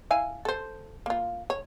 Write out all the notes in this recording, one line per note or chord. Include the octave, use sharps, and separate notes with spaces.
E4 F5 G#5
A4 C5
A#3 F4
C#5